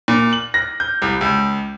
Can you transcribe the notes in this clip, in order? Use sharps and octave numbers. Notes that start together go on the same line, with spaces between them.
A#2
F#7
A#6
G6
C2
C#2